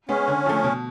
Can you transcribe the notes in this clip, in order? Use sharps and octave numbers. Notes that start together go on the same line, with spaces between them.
G#3 B3 C#4
D3
F3 A3
B2